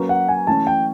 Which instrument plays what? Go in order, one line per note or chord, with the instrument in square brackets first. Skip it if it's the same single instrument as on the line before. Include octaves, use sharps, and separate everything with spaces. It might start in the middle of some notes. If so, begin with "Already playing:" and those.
Already playing: [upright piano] F#3 A#3 C#4 F#4 B4
[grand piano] F#5
G#5
[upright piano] E3 A3 C#4 [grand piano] A5
[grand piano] G5